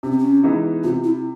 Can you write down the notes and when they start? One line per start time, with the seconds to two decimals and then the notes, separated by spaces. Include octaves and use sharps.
0.03 C3 C#4
0.11 C4
0.18 C#4
0.43 E3 G#3 B3 D#4
0.84 C3 F4
1.04 E4